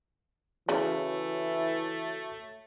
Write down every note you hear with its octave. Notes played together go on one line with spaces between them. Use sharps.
C#3 E3 A3 F#4 C#5